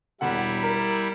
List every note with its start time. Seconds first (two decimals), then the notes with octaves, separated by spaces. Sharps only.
0.21 E1 G3 E4 F#5
0.63 A#4